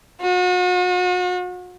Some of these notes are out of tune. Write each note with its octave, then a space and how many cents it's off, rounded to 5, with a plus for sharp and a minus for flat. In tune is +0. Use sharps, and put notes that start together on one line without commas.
F#4 -40